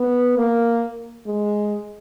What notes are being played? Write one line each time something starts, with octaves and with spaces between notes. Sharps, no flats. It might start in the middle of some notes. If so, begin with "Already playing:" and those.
Already playing: B3
A#3
G#3